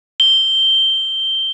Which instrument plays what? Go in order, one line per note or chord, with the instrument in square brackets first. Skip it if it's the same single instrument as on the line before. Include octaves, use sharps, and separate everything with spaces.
[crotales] G7